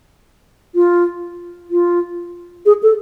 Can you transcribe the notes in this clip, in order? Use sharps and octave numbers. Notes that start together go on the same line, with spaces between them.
F4
F4
G#4
A4